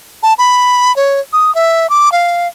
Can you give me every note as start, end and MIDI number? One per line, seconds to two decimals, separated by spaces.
0.23 0.34 81
0.38 0.94 83
0.96 1.20 73
1.33 1.53 87
1.55 1.89 76
1.90 2.12 86
2.12 2.48 77